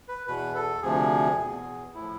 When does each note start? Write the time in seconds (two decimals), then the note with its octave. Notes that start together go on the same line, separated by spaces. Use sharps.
0.09 B4
0.27 E2 B2 B4
0.55 A4
0.82 D2 C3 F3 G#4
1.39 E2 B2
1.95 A2 F3 E4